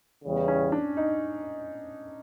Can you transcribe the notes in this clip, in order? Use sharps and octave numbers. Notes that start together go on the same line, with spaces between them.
E2 C#3 E3 G3 B3
C#4
D4
D#4